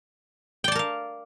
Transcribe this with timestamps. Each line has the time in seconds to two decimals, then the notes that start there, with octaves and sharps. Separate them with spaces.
0.64 G5
0.68 D5
0.72 A5
0.75 A#4
0.79 F5